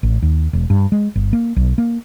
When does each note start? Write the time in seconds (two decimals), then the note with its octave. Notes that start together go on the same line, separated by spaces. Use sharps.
0.03 A1
0.22 D#2
0.53 E1
0.70 G2
0.92 G#3
1.16 G1
1.33 A#3
1.56 B1
1.78 A#3